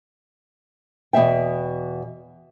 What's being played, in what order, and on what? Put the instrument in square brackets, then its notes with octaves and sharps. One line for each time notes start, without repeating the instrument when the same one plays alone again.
[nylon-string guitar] E2 B2 A3 E5 G5